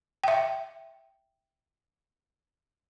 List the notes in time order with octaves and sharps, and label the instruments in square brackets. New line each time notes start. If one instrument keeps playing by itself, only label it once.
[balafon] E5 G5